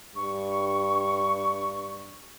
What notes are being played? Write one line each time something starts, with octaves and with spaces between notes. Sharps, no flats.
G2 C#6